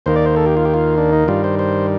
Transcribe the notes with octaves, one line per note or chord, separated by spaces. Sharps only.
D#2 D#3 A#3 C5
D5
C5
A4
G4
F4
G4
F4
D4
D#4
G2 D#3 G3 F4
C5
C5